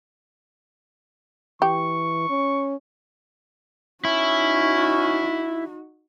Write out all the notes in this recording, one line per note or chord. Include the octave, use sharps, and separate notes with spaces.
E3 G4 C#6
C#4
C#4 D#4 E4 F#4